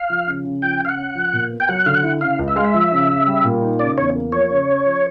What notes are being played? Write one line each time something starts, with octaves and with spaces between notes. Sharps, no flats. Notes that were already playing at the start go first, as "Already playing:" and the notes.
Already playing: F5
F3
C#3
C#3
F3 G5
C#3 F5
F#5
C#4
F3
A#2
B3
G5
F#3 F#5
D3 F5
F#5
E4
C#3 F5
C#2
E5
G#3 F5
E5
F3
C#3
C#3
G3
A#2
D#4
C#3 D5
E2 C#5
A#3
F3 C#5
C#3
C#4
F3